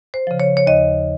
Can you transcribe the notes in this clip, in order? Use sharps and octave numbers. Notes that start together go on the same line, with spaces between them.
C5
C#3 F3
C#5
C#5
D#2 D#5